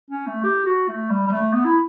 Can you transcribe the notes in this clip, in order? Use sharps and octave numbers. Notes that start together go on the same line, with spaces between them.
C#4
A3
G4
F#4
A3
G3
G3
A3
B3
E4